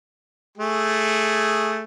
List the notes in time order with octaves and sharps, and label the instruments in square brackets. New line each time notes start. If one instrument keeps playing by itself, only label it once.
[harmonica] A3 G#4